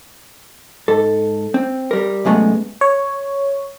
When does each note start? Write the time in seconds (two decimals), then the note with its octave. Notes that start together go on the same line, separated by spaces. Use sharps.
0.88 G#2 A4
1.54 C4
1.91 G3 A#4
2.25 C2 F#2 G#3 A3 B3
2.81 C#5